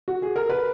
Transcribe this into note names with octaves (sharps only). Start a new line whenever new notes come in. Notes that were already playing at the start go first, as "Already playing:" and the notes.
F#4
G#4
A#4
B4